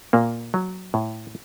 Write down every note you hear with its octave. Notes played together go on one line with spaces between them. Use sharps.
A#2 A#3
F#3
A2